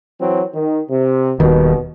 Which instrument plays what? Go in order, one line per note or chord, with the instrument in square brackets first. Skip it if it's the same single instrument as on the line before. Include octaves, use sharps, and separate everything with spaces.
[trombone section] E3 F#3 C4
D#3
C3
[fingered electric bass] D#1 D#3 [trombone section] B2